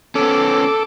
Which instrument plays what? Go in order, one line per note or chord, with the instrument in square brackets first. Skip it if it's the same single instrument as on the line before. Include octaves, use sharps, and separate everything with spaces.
[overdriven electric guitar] B3 C#4 [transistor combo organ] A4 D6